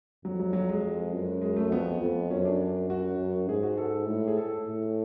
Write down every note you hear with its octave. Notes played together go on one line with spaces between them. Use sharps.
F2 F#3
F#3
F#3
G#3
F#2
G#3
A3
F2 B3
F2
F#2 C#4
D4
F#2 F#4
F#2
G#2 G#4
F#4
A4
A2
G#4
A4
A2